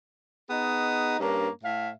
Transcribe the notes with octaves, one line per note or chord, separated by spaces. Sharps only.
B3 D#4 G#4 D#5
G2 A#3 C#4 D4
A2 E5 F5